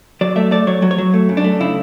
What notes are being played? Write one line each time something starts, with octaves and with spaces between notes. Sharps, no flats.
F#3 D5
A3 E5
A3 D5
F#3 C#5
F#3
C#5
F#3
A3
F#2
D4
A3
C#3 E4